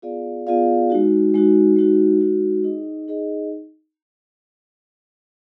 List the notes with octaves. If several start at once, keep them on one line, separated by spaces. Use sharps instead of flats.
B3 F4 G#4 D5 F5
B3 F4 G#4 D5 F5
G#3 D#4 F#4
G#3 D#4 F#4
G#3 D#4 F#4
G#3 D#4 F#4
D#4 G#4 D#5
D#4 G#4 D#5